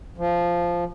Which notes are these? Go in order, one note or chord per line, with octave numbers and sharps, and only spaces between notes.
F3